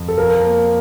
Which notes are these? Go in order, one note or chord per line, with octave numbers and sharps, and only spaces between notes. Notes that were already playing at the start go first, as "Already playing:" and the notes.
Already playing: F2
A4
F3 A#4
A#3